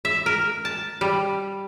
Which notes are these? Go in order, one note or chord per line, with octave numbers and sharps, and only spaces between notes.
E5
A#4
A5
G3